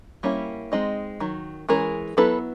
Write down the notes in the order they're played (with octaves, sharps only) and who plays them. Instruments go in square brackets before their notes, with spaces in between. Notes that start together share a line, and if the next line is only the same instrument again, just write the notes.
[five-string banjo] G3 A#3 C#4 E4
G#3 C4 D#4 D#5
D#3 F#3
E3 G#3 C#4 G#4 A#4
F#3 B3 E4 A4 B4